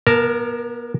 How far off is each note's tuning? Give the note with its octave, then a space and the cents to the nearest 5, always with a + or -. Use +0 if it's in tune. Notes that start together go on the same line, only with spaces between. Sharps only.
B3 -40 A#4 +0 A5 +0